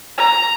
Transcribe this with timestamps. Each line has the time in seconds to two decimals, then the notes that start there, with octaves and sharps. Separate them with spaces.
0.18 A#5